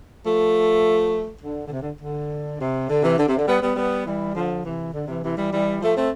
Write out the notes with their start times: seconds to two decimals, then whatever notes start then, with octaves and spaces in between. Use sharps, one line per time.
0.25 F3 A3
1.42 D3
1.67 D3
1.72 C3
1.82 D3
2.02 D3
2.60 C3
2.89 D3
3.03 C3 E3
3.18 D3
3.28 C3
3.38 D3
3.47 G3 B3
3.62 G3 B3
3.76 G3 B3
4.06 E3 G3
4.35 D3 F3
4.64 C3 E3
4.93 D3
5.08 C3 E3
5.24 C3 E3
5.37 E3 G3
5.52 E3 G3
5.81 F3 A3
5.96 A3 C4